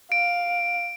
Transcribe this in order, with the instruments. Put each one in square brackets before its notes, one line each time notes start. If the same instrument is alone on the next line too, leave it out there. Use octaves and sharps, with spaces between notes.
[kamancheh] F5 [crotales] D7